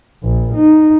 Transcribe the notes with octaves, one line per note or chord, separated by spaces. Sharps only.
A#1
D#4